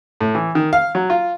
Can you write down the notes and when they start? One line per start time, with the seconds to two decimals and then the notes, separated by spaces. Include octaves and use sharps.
0.21 A2
0.35 E3
0.55 D#3
0.73 F5
0.95 F#3
1.10 F4